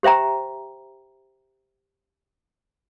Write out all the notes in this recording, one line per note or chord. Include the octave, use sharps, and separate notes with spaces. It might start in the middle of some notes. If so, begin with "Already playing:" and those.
G4 C5 E5 G5 A#5